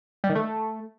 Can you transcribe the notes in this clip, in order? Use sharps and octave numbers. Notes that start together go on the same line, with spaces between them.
G3
D#3
A3